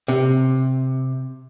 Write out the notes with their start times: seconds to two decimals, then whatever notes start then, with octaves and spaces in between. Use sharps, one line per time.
0.08 C3